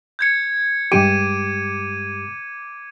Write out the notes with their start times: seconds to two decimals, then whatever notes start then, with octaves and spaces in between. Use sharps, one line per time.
0.19 G6 G#6 C#7
0.92 G2 G#3 G4 D6 D7 D#7